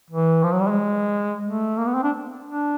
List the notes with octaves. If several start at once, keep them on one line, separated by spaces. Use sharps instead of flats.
E3
F3
F#3
G3
G#3
A3
A#3
B3
C4
D4
D4